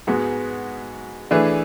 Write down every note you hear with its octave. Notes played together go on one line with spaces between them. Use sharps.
G#2 G#3 B3 F#4
E3 A3 D4 G#4 B4